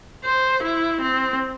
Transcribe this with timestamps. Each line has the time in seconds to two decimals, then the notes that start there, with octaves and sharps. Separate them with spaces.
0.24 C5
0.63 E4
1.01 C4